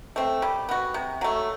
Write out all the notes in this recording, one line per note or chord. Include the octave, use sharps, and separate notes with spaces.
A3 C4
G3
B3 F#4
C3
F#3 A3